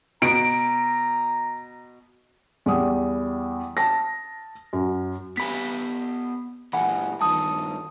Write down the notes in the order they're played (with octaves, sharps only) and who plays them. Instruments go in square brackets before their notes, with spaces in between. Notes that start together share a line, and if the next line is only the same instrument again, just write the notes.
[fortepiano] B2 [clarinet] A#5 [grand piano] D7
[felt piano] E2 G3 D#6
A5 A#6
F#2
[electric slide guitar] B3 G4 G#5 [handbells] B5 B6
[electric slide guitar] A#2 E3 [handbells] F#5 G#5 B5
[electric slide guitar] G2 D#3 [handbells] A5 D#6